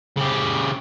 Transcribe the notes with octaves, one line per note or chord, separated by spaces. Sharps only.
C#3 G4